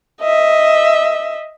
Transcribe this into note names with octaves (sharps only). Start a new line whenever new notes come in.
D#5 E5